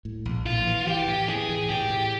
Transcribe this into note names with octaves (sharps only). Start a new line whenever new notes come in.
A2
A#1
A2 F4
E3
E3 G4
A2
E3 G#4
A2
A2 G4
A2